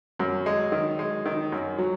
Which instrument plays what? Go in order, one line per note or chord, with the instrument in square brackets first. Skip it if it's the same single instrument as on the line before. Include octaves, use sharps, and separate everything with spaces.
[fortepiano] F#2 [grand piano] F#3
[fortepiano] G#3
D#3
G#3
D#3
F#2
[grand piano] F#3